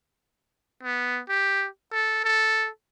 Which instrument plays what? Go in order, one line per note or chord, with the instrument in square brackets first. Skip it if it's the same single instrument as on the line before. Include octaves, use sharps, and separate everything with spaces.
[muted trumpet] B3
G4
A4
A4